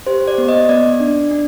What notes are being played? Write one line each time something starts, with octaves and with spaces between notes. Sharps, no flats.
G4 C5
D5
B3
D#5
B3 D5
D4
D4